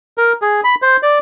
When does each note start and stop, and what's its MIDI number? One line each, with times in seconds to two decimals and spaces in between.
0.18 0.32 70
0.42 0.61 68
0.64 0.75 83
0.82 0.97 72
1.03 1.19 74